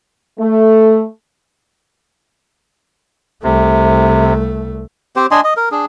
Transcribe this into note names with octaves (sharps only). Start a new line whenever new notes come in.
A3
C2 C3 A3
C4 G4 C5
D4 D#5 G#5 C6
D#5
A#4
D4 G#4